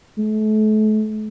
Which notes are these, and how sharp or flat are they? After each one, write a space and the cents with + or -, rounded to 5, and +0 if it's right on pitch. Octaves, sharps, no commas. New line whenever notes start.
A3 -35